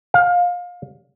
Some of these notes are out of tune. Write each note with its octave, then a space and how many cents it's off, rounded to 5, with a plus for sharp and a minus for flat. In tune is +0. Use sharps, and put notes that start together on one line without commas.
F5 +25